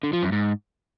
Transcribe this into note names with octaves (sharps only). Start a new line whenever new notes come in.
D3
F3
F#2
G#2